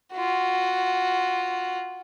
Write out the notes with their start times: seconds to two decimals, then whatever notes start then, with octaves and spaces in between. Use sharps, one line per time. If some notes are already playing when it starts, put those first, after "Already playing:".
0.14 F4 F#4